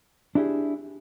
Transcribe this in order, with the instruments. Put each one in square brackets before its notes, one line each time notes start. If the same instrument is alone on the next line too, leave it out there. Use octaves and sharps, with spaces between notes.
[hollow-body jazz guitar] D4 E4 G4 G#4